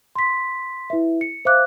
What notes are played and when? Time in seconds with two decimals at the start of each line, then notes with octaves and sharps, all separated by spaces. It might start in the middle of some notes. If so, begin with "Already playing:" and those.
0.16 C6 B6
0.90 E4 B4 E5
1.21 C#7
1.45 C5 E5 F5 D6 F#6